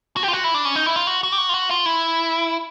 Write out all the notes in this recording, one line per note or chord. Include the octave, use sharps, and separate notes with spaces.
F#4
G4
F4
F#4
E4
D4
C#4
D#4
E4
F4
F#4
F#4
G4
F#4
F4
F#4
F4
E4